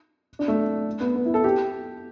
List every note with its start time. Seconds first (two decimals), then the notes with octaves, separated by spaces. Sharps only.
0.39 D4
0.48 A3
1.01 B3
1.15 B3
1.25 E4
1.34 A4
1.44 G4